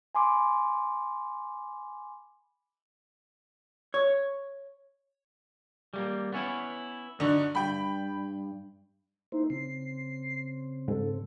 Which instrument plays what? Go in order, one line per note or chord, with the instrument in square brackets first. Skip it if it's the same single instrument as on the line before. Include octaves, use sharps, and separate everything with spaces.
[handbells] G#5 B5 C6 D6
[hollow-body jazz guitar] C#5
[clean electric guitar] G3 A3 A#3
B3 C#4 E4
[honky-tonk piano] D3 [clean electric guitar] D#4 F#4
[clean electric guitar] G2 [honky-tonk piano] G5 B5
[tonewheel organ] A#3 E4 C5 [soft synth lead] D#4
[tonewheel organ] C#3 C4 [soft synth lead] C7
[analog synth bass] G#2 [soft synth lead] A4